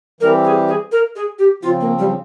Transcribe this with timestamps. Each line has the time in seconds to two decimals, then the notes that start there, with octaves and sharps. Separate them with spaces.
0.21 E3 G3 C4 G4 A#4
0.44 G#4
0.68 G#4
0.92 A#4
1.16 G#4
1.39 G4
1.63 C#3 F3 C4 F4
1.81 A#3
1.99 G3